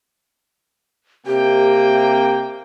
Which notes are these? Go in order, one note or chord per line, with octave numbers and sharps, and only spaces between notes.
C3 A#3 G4 G5